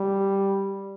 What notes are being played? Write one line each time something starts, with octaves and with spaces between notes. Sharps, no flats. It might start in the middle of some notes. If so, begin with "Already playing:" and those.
Already playing: G3